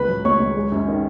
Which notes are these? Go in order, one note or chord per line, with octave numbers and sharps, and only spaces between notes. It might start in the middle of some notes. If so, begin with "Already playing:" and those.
Already playing: C#2 B4 B5
F#3
C#2 C#5 C#6
C#2
G#3
F#2
D#3